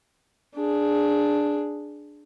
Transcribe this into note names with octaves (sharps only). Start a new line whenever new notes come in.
D4 G#4